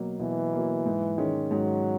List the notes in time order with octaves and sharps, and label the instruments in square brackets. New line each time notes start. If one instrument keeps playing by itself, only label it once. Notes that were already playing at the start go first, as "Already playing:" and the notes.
Already playing: [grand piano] B2 F#3 A#3
[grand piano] B2 [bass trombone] E3
[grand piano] A#3
F#3
G#2
D#3 G#3 C#4
[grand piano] G#2 [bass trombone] F#3